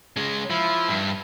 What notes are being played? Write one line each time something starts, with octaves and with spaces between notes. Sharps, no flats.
C#3 G#3
F3 E4
G2